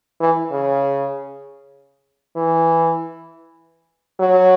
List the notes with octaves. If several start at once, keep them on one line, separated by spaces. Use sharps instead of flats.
E3
C#3
E3
F#3